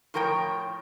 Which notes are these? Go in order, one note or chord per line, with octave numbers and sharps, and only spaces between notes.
A2 F3 A#4 C#5 G5